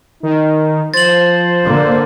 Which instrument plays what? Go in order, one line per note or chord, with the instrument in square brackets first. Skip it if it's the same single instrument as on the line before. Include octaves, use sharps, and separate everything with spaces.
[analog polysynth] D#3 [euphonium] D#4
[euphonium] F3 [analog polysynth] C5 [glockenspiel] A6 F#7
[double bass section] D3 A#3